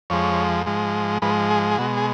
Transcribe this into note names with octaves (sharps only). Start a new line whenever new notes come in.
F2 F3 G#3 C#5
G#2 F3 G#3
G#2 F3 G#3 B4
G#4
G#4
B2 G#3 F#4
G#4